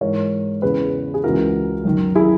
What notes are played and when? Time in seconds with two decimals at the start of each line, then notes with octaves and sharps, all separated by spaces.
0.01 G#2 E3 A#4 C#5
0.62 E2 C#3 E3 G#4 B4
1.14 G#4
1.24 C#2 C#3 E3 F#4 A#4
1.85 F#2 D#3
2.15 E4 G#4